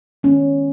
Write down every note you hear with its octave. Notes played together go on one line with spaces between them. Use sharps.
D#3 G#3 B3 C#4